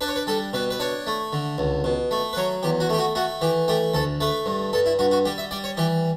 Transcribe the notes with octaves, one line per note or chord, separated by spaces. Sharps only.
D4 B4
C#5
B4
G3 A4
B2 B4
B4
D4 C#5
A3
D3
C#2
B2
A3
B4
F#3 C#5
E2 G4
F#4
A3 G4
F#4
A3 F#4
E3 G4
A3 G4
D2 A4
A3 B4
G2
G2 A4
E4
G2 F#4
F#4
G3 G4
E5
G3 D5
C#5
E3 G4